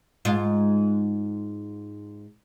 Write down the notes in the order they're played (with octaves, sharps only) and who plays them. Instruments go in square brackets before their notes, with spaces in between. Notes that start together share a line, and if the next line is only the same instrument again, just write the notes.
[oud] G#2 F4